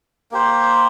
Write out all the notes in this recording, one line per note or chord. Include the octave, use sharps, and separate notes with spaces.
A#3 G4 C5